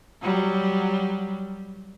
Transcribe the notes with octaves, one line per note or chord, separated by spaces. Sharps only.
F#3 G3